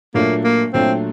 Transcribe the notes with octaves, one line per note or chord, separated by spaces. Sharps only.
A#2 F#3 A3 A#3 D4 F4
A#3
A#2 F#3 A3 C4 D4 F4